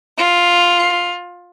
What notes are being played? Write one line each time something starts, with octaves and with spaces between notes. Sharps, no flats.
F4